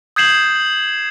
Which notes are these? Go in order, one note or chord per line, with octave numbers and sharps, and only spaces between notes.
D#6 G6 G#6 C7 E7 F#7